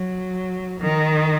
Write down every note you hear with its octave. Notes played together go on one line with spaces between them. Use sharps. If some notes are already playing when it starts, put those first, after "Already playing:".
Already playing: F#3
D#3